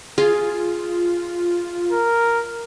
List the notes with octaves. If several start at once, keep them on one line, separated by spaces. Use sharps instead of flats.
F4 G#4
A#4